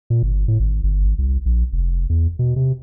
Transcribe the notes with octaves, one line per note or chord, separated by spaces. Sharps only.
A#2
G1
A2
G#1
G1
G#1
C2
A#1
F1
E2
B2
C3